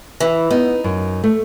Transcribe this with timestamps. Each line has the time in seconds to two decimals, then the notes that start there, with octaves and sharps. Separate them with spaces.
0.20 E3
0.51 B3 D#4
0.84 F#2
1.24 A3